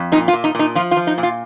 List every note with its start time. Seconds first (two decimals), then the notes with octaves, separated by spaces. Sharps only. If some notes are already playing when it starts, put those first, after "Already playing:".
Already playing: F2
0.12 A#2 D#4
0.28 F4
0.33 A#2
0.44 D#4
0.55 A#2 D#4
0.75 F3 F4
0.91 F4
0.96 F3
1.07 D#4
1.18 A#2
1.23 F4